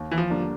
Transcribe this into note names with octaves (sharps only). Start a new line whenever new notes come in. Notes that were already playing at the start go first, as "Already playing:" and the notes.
Already playing: D#2
E3
F3
D3 G3 A#3 D4